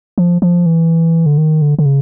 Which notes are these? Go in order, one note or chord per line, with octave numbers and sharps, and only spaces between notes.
F3
F3
E3
D3
D#3
D3
D3
C#3